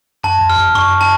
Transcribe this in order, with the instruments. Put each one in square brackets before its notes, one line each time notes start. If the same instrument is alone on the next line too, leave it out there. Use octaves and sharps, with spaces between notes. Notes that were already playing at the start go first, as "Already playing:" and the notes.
[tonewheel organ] F#2 [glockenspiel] A5
[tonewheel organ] F2
[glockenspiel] F6
[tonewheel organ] F#2
F2
[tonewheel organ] F#2 [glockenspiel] C#6
[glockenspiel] A5